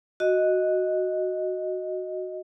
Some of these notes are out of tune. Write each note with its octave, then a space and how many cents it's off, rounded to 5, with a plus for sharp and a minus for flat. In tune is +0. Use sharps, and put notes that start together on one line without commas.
F#4 -5 D#5 +0